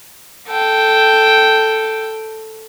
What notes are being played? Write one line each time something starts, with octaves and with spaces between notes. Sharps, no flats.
A4 G5